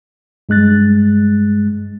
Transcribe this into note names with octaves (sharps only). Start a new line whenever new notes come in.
G2 G#3 F#6 A6